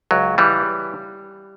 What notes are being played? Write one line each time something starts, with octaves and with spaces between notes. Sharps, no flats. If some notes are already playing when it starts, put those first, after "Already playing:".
C#2 F#3
E3 G3